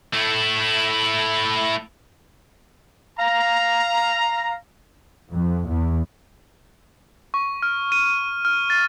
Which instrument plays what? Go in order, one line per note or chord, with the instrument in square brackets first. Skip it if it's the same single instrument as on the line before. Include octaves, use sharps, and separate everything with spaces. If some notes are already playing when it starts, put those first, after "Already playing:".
[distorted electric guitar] A3 E4
[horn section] F5 A#5
[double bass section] F2
E2
[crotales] C#6
F6
D#7
F6
A6